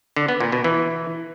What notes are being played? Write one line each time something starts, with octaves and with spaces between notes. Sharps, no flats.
D3
B3
A#2
B2
E3